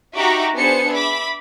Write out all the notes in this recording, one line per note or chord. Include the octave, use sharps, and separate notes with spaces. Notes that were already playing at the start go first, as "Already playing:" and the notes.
D#4 F#4 G4 E5 A#5 D6
B3 D4 G#4 C5 A5 C#7
E5 B5 D6